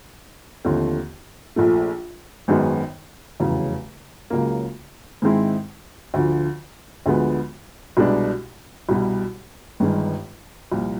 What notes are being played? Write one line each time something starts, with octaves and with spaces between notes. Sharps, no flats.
D#2 D3 F3 A3 C4
A#1 A#2 F3 A3
G#1 F#2 D#3 G#3 B3
F1 E2 C#3 F#3
C#2 C#3 F#3 A#3
G#2 D#3 G#3 C4 E4
D2 D3 F3
D2 D3 F3 G#3 B3
C2 B2 G#3 B3 D4
C2 B2 G3
G1 G2 D#3 G#3
C2 A#2 F3